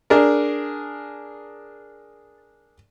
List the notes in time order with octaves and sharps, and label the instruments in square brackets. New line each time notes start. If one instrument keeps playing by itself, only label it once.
[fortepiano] D4 G#4 A#4